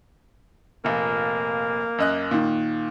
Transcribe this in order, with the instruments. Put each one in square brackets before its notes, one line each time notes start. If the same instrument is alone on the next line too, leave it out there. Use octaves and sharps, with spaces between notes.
[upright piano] F1 A#2 [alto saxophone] A#3
[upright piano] F#2 D#5 F#6
A#2 D#3